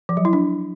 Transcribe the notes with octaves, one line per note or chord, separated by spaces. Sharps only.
F3
F#3
E4
D4